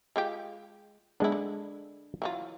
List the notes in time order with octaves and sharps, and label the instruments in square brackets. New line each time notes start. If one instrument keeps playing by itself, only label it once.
[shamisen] G#3 F4 G4
[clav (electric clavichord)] G#3 D4 [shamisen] B3 E4
[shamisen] D3
E3 F#3 F4